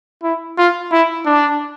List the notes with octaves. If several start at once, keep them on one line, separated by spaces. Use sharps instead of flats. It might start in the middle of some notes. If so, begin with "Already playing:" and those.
E4
F4
E4
D4